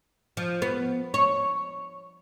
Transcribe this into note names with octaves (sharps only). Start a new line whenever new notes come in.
F3
B3
C#5